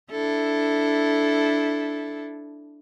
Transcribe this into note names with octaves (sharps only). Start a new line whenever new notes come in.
D4 E4 A4